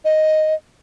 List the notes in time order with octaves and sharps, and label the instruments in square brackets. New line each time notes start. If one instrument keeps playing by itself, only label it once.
[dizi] D#5